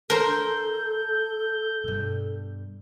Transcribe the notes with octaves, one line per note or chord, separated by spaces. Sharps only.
A4 A#4 C5 G6
G2 B2